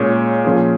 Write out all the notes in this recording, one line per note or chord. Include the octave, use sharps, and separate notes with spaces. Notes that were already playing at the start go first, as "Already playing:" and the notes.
Already playing: A#2 G#3 C#4 G#4 C#5
A#2 F3 C#4 F4 G#4